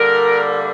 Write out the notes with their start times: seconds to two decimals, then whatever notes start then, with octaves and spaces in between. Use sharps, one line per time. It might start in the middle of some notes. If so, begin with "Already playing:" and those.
Already playing: D3 G3 A#3 A#4